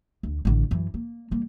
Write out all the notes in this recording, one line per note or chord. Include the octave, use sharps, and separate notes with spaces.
D2
A1 D3
F#2 E3
A#3
G3 A#3